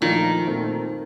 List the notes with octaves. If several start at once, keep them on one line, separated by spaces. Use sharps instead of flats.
A#2 D#3 F3 A3 D4 F4
A#2 A3 C4